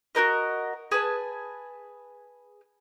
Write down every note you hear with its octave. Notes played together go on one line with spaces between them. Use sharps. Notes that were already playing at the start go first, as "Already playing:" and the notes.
F#4 G4 A#4 D#5
G#4 B4 G#5 A5